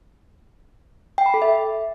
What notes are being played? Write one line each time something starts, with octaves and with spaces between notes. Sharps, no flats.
G5
B5
A4
E5